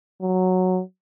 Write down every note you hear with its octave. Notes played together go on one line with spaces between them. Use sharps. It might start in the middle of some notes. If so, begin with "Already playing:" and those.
F#3